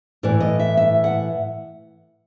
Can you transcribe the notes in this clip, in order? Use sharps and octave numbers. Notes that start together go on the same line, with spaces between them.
A2 E3 D5
D#5
E5
E5
F#5